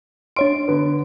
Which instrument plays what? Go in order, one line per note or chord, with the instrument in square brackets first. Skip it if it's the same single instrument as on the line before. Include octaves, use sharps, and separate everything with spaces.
[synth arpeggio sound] D4 C#5 D7 [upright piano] C6
[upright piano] D3 B3